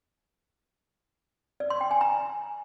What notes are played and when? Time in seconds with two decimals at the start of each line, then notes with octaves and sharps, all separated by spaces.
1.60 D5
1.70 C6
1.81 G5
1.91 G#5
2.01 A#5